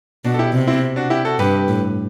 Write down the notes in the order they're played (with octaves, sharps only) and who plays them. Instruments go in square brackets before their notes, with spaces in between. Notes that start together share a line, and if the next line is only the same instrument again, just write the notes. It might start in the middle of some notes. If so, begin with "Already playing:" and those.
[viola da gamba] B2 [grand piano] D4 F#4
[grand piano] A4
E4 G4
[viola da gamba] C3
[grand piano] C4 E4
D4 F#4
E4 G4
F#4 A4
[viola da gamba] G2 [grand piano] G4 B4
[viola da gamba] A2